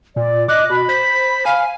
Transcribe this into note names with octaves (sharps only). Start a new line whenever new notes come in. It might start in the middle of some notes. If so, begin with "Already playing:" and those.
A#2 D5
D#5 D6 F#6
B2 B5
C5 B6
F5 G#5